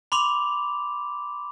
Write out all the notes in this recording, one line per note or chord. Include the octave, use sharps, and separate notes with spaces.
B5 C6 D6 F7